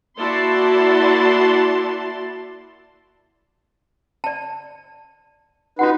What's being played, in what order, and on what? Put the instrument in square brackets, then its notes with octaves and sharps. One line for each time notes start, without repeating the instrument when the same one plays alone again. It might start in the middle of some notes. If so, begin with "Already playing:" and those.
[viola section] A#3 E4 F#4 D5 A5 C6
[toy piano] D5 A5
[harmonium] D#4 B4 [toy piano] F4 F#4 F#5